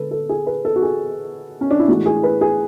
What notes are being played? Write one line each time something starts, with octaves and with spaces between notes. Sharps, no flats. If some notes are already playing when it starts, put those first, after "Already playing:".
Already playing: D3 G#3 A4 B4
A4
G#4
B4
A4
F#4
G#4
C#4
D4
E4
A2 E3 G#3 F#4
G#4
B4
G#4